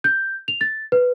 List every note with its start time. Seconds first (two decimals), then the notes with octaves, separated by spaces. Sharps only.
0.04 G6
0.48 F7
0.61 A6
0.92 B4